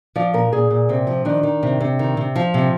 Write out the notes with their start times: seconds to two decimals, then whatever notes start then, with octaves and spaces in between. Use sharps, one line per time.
0.16 F3 D5
0.34 A#2 A#4
0.53 A#2 G#4
0.70 A#2
0.89 C3 C4
1.07 F3
1.25 D#3 D4
1.43 D#3
1.63 C3
1.81 C3
1.99 D#3
2.17 C3
2.36 F3
2.54 C3